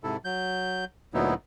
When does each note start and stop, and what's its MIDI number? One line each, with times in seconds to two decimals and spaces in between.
0.04 0.17 44
0.04 0.17 48
0.04 0.17 64
0.04 0.17 69
0.25 0.85 54
0.25 0.85 91
1.14 1.34 38
1.14 1.34 46
1.14 1.34 54
1.14 1.34 59
1.14 1.34 63
1.14 1.34 64